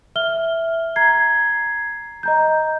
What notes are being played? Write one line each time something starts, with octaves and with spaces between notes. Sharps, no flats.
E5 F6 G7
A#5 G#6 C7
D#5 A#5 G6